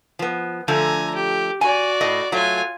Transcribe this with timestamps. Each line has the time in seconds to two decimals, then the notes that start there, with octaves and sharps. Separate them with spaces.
0.19 F3 B3
0.68 D3 F3 A3 G#5 A#5
1.15 G4
1.61 F#4 D5 G#5
2.01 A2 D#5
2.32 F#3 A3 F4 G#5